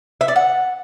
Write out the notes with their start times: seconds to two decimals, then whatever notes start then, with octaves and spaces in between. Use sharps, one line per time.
0.21 E5
0.28 D5
0.36 F#5